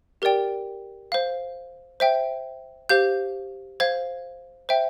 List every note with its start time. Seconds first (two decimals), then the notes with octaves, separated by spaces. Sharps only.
0.22 G4 A#4 D5 G5
1.12 C5 F5
2.00 C5 E5 G5
2.89 G4 C5 F5 G6
3.80 C5 F5 G#6
4.69 C5 E5 G5